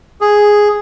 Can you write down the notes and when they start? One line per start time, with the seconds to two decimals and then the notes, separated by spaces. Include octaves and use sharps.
0.21 G#4